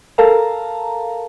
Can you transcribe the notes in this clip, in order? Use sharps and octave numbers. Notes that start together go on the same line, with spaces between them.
A4 A#4 F5 A5 A#5